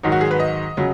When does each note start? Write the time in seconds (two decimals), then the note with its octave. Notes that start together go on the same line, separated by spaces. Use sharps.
0.03 G#2 D#3 F#3 D#4
0.12 F#4
0.21 G#4
0.31 B4
0.40 D#5
0.77 C#3 F#3